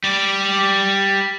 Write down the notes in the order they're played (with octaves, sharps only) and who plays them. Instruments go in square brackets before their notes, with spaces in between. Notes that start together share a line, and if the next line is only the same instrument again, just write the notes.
[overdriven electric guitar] G3 D5